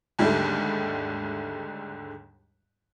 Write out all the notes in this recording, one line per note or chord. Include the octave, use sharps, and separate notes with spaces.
D#2 G#2 D3 D#3 G3 A3